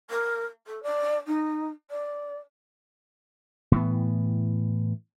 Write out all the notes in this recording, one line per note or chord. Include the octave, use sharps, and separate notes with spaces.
A#4
A4
D5
D#4
D5
A2 E3 B3